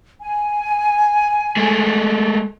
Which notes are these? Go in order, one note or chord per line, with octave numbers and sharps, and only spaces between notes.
G#5
G#3 A3